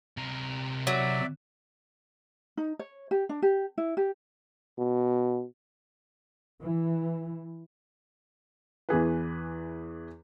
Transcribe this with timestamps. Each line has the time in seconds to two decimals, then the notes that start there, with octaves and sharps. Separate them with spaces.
0.17 C3 A#4
0.87 F#3 D5 E5
2.57 D#4
2.79 C#5
3.11 G4
3.29 D4
3.42 G4
3.78 E4
3.97 G4
4.78 B2
6.63 E3
8.89 E2 E3 G#4 B4